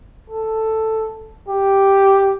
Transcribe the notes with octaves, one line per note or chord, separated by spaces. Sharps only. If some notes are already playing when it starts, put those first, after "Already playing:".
A4
G4